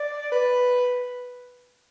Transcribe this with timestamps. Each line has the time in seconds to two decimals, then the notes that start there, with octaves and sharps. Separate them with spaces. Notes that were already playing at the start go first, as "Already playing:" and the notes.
Already playing: D5
0.32 B4